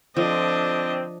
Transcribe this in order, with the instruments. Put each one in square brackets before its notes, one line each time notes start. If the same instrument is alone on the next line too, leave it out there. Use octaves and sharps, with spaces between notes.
[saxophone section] D3 C4 [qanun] F3 [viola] D4 D#5